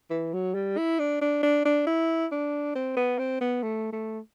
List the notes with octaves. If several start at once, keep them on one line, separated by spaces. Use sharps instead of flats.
E3
F#3
G3
E4
D4
D4
D4
D4
E4
D4
C4
B3
C4
B3
A3
A3